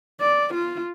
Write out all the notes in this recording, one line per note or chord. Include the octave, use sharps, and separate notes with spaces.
D5
F4